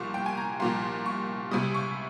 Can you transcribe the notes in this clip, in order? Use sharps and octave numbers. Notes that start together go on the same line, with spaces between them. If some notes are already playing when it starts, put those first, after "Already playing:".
Already playing: C2 A#2 F3 C#6
G5
G#5
A#5
C2 A#2 F3 C6
C#6
C#2 C3 G3 D#6
C#6